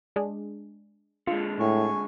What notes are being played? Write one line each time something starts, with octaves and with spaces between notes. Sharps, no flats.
G#3 D4 G#4
D3 G#3 F4
A2 G#5 C#6